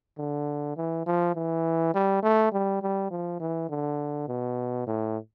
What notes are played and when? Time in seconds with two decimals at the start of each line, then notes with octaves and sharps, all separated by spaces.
0.18 D3
0.77 E3
1.06 F3
1.35 E3
1.94 G3
2.23 A3
2.52 G3
2.82 G3
3.11 F3
3.40 E3
3.69 D3
4.28 B2
4.87 A2